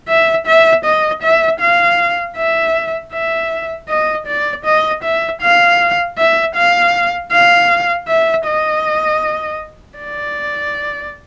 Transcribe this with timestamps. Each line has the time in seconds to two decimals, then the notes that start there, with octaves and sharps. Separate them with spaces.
0.08 E5
0.47 E5
0.85 D#5
1.22 E5
1.61 F5
2.37 E5
3.12 E5
3.89 D#5
4.27 D5
4.65 D#5
5.03 E5
5.41 F5
6.18 E5
6.55 F5
7.31 F5
8.08 E5
8.46 D#5
9.98 D5